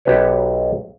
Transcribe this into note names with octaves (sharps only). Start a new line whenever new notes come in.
B1 G4 B4 C#5